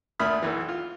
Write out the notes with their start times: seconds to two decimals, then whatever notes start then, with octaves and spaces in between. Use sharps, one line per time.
0.19 D2 A#2 E5 B5 D#6 F6
0.42 B1 E3
0.68 F4